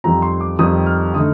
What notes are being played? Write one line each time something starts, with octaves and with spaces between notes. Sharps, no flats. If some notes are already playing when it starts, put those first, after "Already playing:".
F2 D#3 G3 C4 A#5
C6
D6
F2 D#3 G3 C4 D#6
F6
D3 A3 D#4 D#6